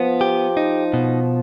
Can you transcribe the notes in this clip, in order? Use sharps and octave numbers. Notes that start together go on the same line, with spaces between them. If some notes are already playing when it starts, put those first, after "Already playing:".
Already playing: F3 B3
G4
D#4
B2